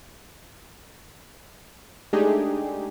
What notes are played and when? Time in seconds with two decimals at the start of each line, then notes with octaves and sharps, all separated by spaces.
2.13 G#3 A3 D4 D#4 G4 G#4